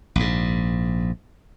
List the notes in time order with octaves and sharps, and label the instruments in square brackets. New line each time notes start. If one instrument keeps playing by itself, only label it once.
[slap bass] A#1 G#2